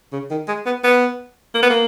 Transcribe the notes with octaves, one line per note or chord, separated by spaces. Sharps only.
C#3
D#3
G#3
B3
B3
A#3
B3
A#3